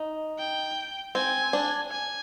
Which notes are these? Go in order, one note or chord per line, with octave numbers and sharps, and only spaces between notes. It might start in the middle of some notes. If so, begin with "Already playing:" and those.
Already playing: D#4
G5
C4 G#5
D4
G#5